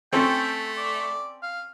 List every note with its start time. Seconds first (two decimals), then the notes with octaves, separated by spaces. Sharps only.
0.13 A3 C4 C#4 A4 G5
0.77 D5
1.43 F5